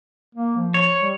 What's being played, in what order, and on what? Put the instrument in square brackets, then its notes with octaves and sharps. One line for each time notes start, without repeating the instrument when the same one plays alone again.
[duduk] A#3
F3
[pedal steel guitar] C#5
[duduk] G3